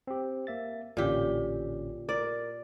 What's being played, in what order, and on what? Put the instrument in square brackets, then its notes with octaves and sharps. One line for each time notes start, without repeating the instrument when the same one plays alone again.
[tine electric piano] C4 G4
A#3 E5 A6
[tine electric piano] A1 D3 C#4 [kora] A#2 G4
[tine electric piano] A#4 [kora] D5